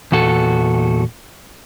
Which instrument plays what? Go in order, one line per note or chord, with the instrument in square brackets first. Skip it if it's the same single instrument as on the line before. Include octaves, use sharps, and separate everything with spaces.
[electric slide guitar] E2 A#2 F#4 A4